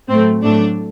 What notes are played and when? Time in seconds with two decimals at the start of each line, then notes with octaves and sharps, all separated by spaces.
0.09 A2 F#3 A3 C4
0.42 A2 F#3 A3 D4